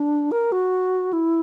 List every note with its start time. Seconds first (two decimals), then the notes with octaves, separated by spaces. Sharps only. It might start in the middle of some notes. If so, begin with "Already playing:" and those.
Already playing: D4
0.32 A#4
0.52 F#4
1.13 E4